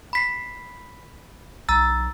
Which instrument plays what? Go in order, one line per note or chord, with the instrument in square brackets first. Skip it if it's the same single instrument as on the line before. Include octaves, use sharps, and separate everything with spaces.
[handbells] B5 B6 C7
[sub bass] B1 [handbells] A#5 E6 A6